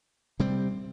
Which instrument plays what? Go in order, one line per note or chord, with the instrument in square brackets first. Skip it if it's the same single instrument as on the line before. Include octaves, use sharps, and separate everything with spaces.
[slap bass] C3 G3 C4